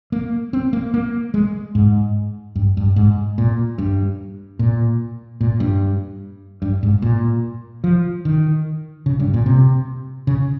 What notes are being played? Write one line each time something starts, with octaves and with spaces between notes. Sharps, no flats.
A#3
C4
A#3
A#3
G#3
G#2
G2
G2
G#2
A#2
G2
A#2
A#2
G2
G2
G#2
A#2
F3
D#3
C#3
G2
A#2
C3
C#3